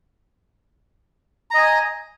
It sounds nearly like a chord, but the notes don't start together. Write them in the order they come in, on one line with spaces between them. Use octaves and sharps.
A#5 D#5 G#5